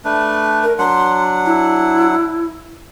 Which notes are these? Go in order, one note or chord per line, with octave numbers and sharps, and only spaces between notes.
A3 D4 B4
A#4
F#3 D4 F#5 C6
E4